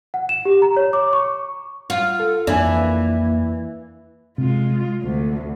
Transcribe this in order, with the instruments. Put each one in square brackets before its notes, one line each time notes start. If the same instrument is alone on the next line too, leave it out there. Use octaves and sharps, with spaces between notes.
[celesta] F#5
E7
G4
A#5
C#5
D6
C#6
[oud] F4
[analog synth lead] A4
[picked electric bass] F2 D4 [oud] E3 [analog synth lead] A#3 [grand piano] D5 G#5
[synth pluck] C3 [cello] G#3 F4
[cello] D2